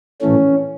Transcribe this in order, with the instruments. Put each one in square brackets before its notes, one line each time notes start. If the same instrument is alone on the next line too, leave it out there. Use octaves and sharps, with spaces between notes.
[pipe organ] A2 E3 A3 C#4